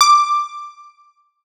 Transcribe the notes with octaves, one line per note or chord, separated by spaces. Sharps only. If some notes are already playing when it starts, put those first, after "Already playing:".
D6